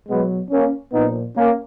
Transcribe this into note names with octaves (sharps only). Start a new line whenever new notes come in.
B2 F#3 G#3 B3
A#3 C#4
A#2 F3 B3 D#4
A#3 C#4